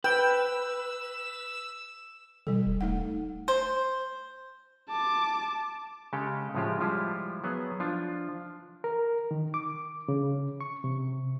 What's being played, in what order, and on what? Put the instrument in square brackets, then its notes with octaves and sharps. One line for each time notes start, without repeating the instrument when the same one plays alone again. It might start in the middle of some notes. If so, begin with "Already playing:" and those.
[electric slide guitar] B4 [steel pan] G5 [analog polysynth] E6
[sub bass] B2 [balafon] G3 A4
[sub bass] D#1
[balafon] A3 D#4 F#5
[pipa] C5
[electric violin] A5 D6
[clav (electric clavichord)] C#3 G#3 G4 A4
A2 C#3 F3 G#3 F4 G4
F3 G3 G#3 E4 F4
F#3 B3 G#4
F3 D4 F4
[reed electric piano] A#4
D#3
D6
C#3
C#6
C3